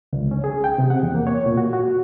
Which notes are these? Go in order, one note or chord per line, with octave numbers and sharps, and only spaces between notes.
C#2
C#4
G#4
G5
C3
F#5
E2
A#3
C#5
A#2
F#4
F#4